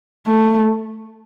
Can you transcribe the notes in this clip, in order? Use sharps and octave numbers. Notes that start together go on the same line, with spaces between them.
A3